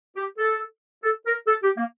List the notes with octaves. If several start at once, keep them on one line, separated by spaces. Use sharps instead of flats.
G4
A4
A4
A#4
A4
G4
A#3